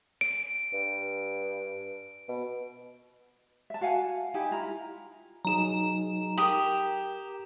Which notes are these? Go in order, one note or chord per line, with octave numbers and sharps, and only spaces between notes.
D7
G2
B2
E5 A5
F#4 F5 F#5 G#5
D#4 E4 G4 G#5
E4 F4 A#5
F#3 D#4 G#4 A#5 E7
G4 A#4 G5 D#6